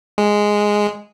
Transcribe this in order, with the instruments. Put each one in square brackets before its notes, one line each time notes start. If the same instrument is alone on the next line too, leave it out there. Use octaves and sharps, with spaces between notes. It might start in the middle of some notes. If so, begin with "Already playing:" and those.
[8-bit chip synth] G#3